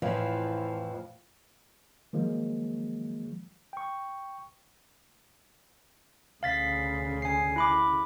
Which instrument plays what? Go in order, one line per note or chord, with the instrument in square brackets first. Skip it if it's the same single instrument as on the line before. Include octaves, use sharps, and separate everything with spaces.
[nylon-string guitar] F2 A2 E3 F3
[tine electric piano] D#3 F3 F#3 G#3 A#3
G5 C#6
[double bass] D2 C#3 [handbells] F5 A6 B6
[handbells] G#5 C7
E4 B5 D6